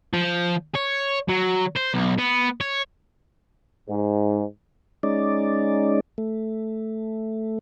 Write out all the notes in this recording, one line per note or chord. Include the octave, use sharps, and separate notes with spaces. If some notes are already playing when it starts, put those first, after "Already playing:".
F3
C#5
F#3
C5
B1
B3
C#5
G#2
G#3 C#4 D#4 D5
A3